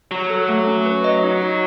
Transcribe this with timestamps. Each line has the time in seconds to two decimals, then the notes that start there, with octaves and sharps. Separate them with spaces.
0.11 F#3 F#4
0.30 A4
0.49 A3
0.68 C#4
0.86 B4
1.04 D#5
1.23 D#4
1.42 F#4